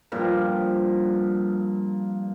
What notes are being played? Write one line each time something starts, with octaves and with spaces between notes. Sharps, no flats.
G2 A#2 F3